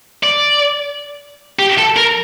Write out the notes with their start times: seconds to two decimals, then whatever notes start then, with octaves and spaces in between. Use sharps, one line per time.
0.23 D5
1.59 G4
1.78 A4
1.97 A#4